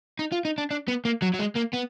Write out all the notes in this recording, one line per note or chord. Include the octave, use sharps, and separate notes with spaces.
D#4
F4
D#4
D4
D4
B3
A#3
F#3
F#3
G#3
A#3
B3